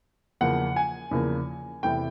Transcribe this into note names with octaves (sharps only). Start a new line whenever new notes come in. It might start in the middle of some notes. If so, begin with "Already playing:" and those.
E2 C#3 F3 A#3 F#5
G#5
E2 C#3 F3 A#3
E2 C3 E3 A3 G5